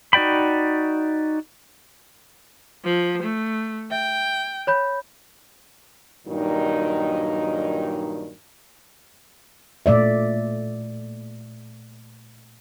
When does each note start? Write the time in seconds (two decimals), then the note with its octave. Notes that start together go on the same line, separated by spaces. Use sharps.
0.13 D#4 F#4 D5 G5 B5
2.85 F3
3.22 A3
3.91 E5 G5
4.67 C#5 B5 G6
6.27 G2 A#2 D#3 F#3 D#4
9.86 A#2 A3 D5 E5